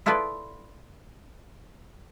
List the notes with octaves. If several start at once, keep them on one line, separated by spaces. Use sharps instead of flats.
E4 F4 G#4 A4 B4 D5